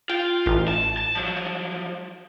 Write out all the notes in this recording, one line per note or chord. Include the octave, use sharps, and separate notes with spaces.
F4 G5
A1
A5
A5
F3 F#3